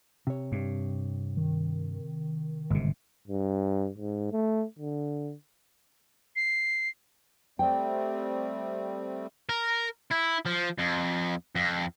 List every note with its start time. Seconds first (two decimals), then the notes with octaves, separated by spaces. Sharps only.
0.27 C3 C#5
0.52 G2
1.37 D#3
2.70 G1 G#2 C3
3.27 G2
3.98 G#2
4.32 A3
4.79 D3
6.36 C7
7.59 G3 A3 C4 G5
9.49 A#4
10.11 E4
10.46 F3
10.78 F2
11.56 F2